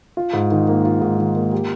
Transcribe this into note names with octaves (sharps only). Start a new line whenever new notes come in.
F4
G#2
D#3
A#3
F4
G#2
D#3
A#3
G4